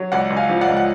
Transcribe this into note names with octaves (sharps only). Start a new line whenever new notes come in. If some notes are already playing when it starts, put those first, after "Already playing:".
Already playing: F#3
C#2 D5 F#5
C#2
F5 G#5
F3
D5 F#5
C#2
F#5